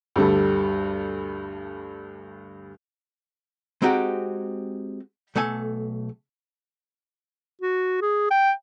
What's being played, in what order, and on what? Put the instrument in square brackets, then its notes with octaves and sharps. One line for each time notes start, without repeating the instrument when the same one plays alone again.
[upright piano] D2 G2 G3 A4
[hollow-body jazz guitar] G#3 C4 D#4 F#4 G4
B1 A3 A4 G#5
[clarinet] F#4
G#4
G5